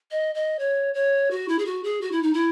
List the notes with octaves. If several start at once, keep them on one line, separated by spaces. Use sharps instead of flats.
D#5
D#5
C#5
C#5
F#4
E4
G#4
F#4
G#4
F#4
E4
D#4
E4